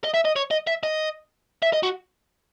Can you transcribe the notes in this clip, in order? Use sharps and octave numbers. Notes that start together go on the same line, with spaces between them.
D#5
E5
D#5
C#5
D#5
E5
D#5
E5
D#5
F#4